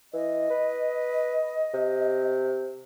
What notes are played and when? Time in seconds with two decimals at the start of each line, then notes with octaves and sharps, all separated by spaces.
0.13 E3 D#5
0.50 B4
1.74 C3